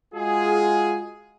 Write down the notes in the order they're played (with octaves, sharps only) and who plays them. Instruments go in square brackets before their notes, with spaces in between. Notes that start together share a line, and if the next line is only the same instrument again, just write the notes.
[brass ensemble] G#3 F4 F#4 G#4